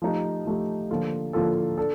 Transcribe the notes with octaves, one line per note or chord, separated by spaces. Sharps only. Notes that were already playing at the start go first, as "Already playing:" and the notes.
F3 A3 D#4 G4
F3 A3 D#4 G4
D3 F3 A#3 F4 A4
D3 F3 A#3 F4 A4
D4 A4